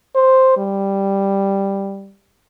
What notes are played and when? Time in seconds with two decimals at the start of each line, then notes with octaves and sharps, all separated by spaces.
0.15 C5
0.57 G3